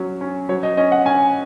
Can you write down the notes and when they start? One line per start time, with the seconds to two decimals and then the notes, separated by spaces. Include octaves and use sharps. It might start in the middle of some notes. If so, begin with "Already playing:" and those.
Already playing: F#3 C#4
0.21 C#4
0.49 F#3 C#5
0.63 D#5
0.77 C#4 D#5
0.92 F#5
1.05 C#4 G#5